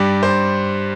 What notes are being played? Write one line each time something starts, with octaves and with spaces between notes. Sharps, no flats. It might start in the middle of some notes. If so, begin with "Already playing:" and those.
Already playing: G2 G3 D5
C5